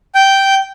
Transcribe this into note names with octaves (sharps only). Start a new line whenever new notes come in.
G5